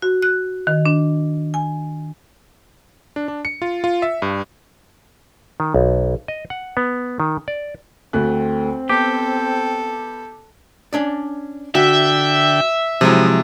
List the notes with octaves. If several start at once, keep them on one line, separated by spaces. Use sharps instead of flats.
F#4
F#6
D#3
D4
G#5
D4
D4
C#7
F4
F4
E5
G2
D#3
B1
D#5
F#5
B3
D#3
D5
D2 A3 C4 F#6
B3 G4 A4
C#4 D4 D5
D3 F#4 E5 G5
C3 F3 F#3 G#3 E4 D#6